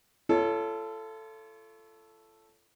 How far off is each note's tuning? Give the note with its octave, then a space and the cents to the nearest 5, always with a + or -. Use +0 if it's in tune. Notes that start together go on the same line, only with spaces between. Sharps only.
F4 -40 A4 +0 C#5 +10